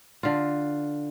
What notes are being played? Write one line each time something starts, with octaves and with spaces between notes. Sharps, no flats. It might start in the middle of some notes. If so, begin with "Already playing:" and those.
D3 F4